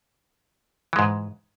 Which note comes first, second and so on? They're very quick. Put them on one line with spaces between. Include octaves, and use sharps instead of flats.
E3 G#3 G#2